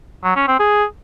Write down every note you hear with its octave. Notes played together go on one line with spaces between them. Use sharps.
F#3
C#4
C4
G#4